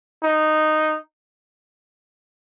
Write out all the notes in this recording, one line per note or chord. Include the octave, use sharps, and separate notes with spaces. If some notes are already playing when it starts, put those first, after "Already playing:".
D#4